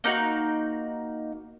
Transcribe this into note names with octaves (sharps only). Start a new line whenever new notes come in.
A#3 D#4 F#4